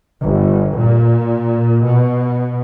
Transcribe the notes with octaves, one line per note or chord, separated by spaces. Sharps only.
G1
A#2
B2